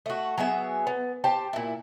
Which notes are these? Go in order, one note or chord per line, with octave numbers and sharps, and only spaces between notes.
A3 F#4
F#3 B3 G#4 E5
B3
G4 C5 A5
A#2 E4